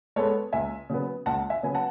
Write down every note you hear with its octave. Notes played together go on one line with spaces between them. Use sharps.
G#3 B3 A4 C#5
C#2 E5 G#5
C#3 F#3 B3
C#2 F#5 A5
E5 G#5
C#3 F#3 B3 G#5
F#5 A5